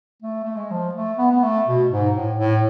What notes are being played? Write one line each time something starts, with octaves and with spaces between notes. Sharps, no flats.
A3
A3
G#3
F3
A3
B3
B3
A3
B2
G#2
A2
A2